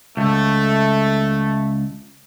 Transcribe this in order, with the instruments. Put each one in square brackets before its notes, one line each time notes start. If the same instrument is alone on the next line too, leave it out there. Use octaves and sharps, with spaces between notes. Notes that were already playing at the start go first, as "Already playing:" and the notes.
[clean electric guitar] C#2 [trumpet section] A3